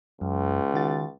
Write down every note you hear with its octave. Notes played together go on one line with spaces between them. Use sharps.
C#2 F#2
D#3 F#4 A6